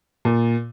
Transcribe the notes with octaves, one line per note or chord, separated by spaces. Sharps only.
A#2